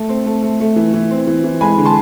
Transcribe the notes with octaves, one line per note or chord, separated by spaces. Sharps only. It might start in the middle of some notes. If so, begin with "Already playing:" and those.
Already playing: A3
C4
A3
A3
A3
E3
E3
C4
E3
E3
G#3 G#5 B5
D3
A5 C6